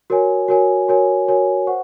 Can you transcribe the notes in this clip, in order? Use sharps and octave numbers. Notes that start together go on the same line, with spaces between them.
F#4 A#4 C#5 G#5
F#4 A#4 C#5 G#5
F#4 A#4 C#5 G#5
F#4 A#4 C#5 G#5
C5 F#5 C#6